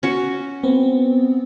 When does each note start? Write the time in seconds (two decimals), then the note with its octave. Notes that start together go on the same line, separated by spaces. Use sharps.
0.03 C#4 F#4
0.63 B3 C4